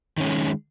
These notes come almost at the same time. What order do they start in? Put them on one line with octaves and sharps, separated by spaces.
D#3 C#4 G#3